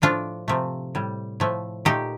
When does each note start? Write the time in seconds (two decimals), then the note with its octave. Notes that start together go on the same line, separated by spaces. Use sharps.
0.02 A2 F3 A3 D4 F4
0.48 C3 F3 A3
0.95 A2 G3
1.40 A2 F3 A3
1.85 A#2 A3 D#4 G4